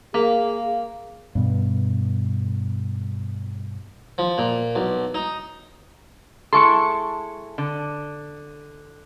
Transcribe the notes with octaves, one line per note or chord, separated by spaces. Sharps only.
A#3 G#4 F5
G2 B2
F3
A#2
B1
D#4
G#3 E4 A4 C6 C#6 C#7
D3